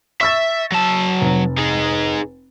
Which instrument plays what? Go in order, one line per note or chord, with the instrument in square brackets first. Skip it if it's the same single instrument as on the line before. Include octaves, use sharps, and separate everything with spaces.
[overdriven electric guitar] E5 [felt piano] C#6 E6 A6
[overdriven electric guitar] F#3 A5
[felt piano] F1
[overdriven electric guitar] D#4 G#4